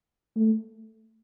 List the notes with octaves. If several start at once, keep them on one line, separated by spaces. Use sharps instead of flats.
A3